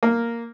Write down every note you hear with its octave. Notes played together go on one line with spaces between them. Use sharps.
A#3